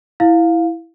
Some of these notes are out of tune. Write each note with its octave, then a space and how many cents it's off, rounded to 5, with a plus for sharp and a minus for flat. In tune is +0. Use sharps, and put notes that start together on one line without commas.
E4 +0 F5 +10